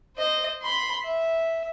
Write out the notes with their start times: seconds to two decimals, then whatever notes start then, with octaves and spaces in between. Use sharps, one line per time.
0.16 C5 D#5
0.62 B5 C6
1.04 E5